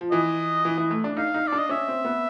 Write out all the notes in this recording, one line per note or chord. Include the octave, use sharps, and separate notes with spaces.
F3
E3 D#5
E3
E3
A3
D4
D#4 F5
D#4
D5
D4
D#5
C#4 E5
C4
B3